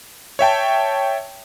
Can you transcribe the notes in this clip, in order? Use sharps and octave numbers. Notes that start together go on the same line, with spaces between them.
C#5 E5 G5 A5